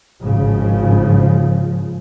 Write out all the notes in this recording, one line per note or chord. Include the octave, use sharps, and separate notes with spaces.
G#1 C#3 F3